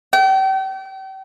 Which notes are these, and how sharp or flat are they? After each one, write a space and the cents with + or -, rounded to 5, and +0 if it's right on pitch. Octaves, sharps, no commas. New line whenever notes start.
G5 -35